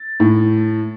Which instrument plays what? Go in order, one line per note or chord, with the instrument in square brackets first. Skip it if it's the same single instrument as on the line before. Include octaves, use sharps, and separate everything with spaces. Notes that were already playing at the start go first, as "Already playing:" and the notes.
Already playing: [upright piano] A6
A2